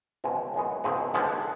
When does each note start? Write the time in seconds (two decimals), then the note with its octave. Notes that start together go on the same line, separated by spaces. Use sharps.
0.24 C#2 B2 G#3 C4
0.54 F#2 D#3 G#3 B3
0.84 C#2 B2 G#3 C4 D#4
1.14 D#2 D3 F3 G#3 B3